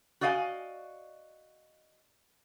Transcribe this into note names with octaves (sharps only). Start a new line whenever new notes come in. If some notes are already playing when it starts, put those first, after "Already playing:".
F#4 D5 D#5 F5 G5 G#5